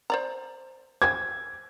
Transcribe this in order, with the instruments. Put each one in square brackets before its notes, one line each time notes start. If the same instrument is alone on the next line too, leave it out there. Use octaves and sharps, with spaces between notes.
[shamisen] C5 D5 A#5
[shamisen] C5 G5 G#5 [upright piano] G#6